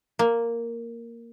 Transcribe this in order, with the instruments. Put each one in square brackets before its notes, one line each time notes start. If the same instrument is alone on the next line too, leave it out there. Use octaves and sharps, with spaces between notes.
[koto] A#3